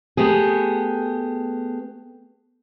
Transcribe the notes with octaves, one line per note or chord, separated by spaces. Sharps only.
A3 B3 G4 G#4